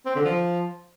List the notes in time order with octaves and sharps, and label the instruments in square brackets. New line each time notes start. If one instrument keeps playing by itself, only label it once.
[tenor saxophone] C4
D3
F3